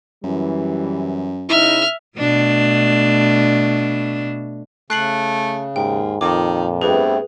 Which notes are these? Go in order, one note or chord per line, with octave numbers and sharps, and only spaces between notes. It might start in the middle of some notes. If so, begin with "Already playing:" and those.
F#2 E3 G3
C#3 D#4 E4 E5 F6
B2 A3 D4
C#3 A3 F#6 C7 F#7
D#2 G#2 G5
F2 A#2 D#3 D6
G2 A3 B3 C4 G#4 B4